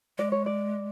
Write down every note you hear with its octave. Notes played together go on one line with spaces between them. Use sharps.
G#3 D5
C#5
D5